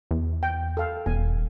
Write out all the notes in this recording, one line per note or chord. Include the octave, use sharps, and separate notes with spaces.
E2
G5
A4 F5
D#1 E2 G#5